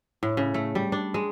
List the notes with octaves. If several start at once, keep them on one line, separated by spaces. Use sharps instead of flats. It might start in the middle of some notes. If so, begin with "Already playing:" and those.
A2
C#3
A3
G3
D4
G#3